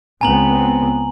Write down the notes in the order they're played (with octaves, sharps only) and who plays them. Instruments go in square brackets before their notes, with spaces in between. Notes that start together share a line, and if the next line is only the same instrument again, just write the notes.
[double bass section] C#2 B3 C4 [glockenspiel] G#5 A#5 F#7